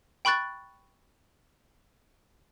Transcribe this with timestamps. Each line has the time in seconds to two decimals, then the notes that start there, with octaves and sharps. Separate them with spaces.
0.25 G5 B5 C#6 F#6 A6